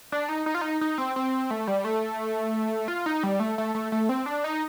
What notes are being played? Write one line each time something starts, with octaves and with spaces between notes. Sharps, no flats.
D4
D#4
D#4
F4
D#4
D#4
C4
C4
A3
G3
A3
F4
D#4
G3
A3
A3
A3
A3
C4
D4
D#4